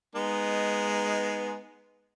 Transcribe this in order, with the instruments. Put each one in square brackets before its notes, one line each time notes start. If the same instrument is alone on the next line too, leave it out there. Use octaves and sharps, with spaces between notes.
[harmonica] G#3 B3 D#4